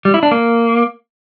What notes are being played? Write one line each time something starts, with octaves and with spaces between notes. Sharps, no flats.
G3
E4
D4
A#3